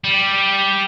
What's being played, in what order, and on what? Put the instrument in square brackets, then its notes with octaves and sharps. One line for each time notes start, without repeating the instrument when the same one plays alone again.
[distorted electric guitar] G3